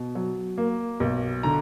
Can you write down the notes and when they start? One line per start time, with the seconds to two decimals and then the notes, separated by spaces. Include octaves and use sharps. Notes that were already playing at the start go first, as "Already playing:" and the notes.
Already playing: B2
0.15 F#3
0.58 A#3
1.00 B1
1.43 D3 A#5